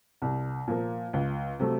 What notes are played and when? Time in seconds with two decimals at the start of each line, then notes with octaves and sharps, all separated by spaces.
0.22 C2
0.67 A#2 F3 A#3
1.13 C#2
1.59 C3 F#3 A3